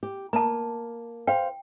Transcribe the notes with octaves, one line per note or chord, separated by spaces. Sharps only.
G4
A#3 A5 A#5
C5 F5 G5